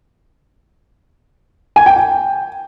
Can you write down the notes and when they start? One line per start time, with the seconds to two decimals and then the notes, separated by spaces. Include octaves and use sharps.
1.76 G#5
1.86 G5
1.96 G5